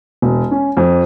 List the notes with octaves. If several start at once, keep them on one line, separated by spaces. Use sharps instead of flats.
E1
C#4
F2